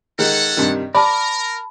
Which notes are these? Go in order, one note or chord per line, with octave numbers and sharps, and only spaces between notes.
D#3 G#3 C#4 A4 F#5
G2 C3 D#3
A#4 D5 A5 B5